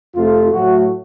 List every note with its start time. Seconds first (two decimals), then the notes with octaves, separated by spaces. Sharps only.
0.15 F2 C3 F3 A3 F4
0.50 A2 F#3 A3 F#4